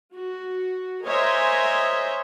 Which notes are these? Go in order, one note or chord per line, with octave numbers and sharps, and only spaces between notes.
F#4
A#4 C5 C#5 D#5 E5 G#5